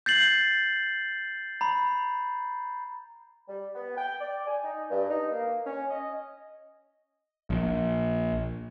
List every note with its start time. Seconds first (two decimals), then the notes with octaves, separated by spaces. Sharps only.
0.06 G6 A6 C7 F#7
1.61 A#5 B5
3.48 G3
3.75 B3
3.97 G5
4.20 D5
4.48 G#5
4.63 D#4
4.90 G2
5.10 D#4
5.30 A#3
5.66 C#4
5.90 D#5
7.50 A#1